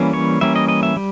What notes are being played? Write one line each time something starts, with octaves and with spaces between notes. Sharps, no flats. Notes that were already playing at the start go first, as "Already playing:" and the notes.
Already playing: E3 G3 A#3 C#4
C#5
E3 G3 A#3 C#4 E5
D#5
D#5
E5
G3